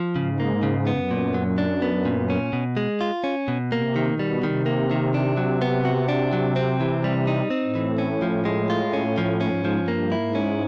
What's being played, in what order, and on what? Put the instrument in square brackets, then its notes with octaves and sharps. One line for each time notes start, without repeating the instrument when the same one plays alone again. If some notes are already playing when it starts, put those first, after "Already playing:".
Already playing: [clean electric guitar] F3
[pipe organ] G#2 [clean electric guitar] C#3
[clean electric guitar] A#3
C#3
[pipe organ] F#2 [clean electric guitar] B3
[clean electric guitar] A#2
F#3
D4
B3
A#2
C#4
B2
G#3
F4
C#4
B2
[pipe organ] C3 [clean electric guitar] A#3
[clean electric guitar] D#3
[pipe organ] B2
[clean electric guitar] G3
[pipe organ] C3 [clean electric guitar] D#3
[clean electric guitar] A#3
D#3
D4
F#3
B3
F#4
D4
F#3
C4
E3
G3
D#4
C4
[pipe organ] A2
[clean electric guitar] E3
C#4
F3
G#3
F4
C#4
F3
[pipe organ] G#2 [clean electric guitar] C#4
[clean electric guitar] F3
[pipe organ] G2
[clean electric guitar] A#3
[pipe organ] G#2 [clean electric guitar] E4
[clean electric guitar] C#4